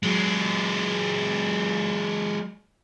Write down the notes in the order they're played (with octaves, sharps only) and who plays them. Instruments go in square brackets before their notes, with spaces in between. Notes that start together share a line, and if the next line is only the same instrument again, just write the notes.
[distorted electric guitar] F#3 G#3